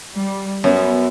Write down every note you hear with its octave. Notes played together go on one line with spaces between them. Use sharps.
G3
F#2 B3